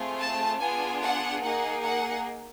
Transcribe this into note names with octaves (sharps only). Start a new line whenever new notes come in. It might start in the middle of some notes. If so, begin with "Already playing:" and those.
Already playing: A3 C4 F4 G#4
A5
B3 D4 F4 G#4 G#5
F#5
A#3 D#4 G#4 F#5
F#5